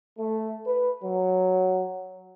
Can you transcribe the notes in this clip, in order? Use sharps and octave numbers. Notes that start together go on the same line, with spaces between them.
A3
B4
F#3